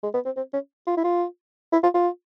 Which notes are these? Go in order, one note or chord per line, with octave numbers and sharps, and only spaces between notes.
G#3
B3
C4
C4
C#4
F4
E4
F4
E4
F4
F4